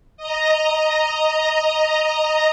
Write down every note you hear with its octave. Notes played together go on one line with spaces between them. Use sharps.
D#5 A#5